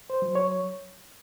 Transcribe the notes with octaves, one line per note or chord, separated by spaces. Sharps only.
C5
F#3
C#5